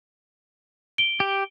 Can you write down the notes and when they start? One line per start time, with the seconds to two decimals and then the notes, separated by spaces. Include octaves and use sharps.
0.98 D7 G7
1.20 G4